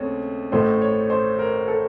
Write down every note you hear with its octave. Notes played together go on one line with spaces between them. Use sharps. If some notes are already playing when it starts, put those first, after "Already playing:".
Already playing: D#2 C#3 A3 C4 C#5
A1 A2 A3 C5
C#5
C5
A#4
A4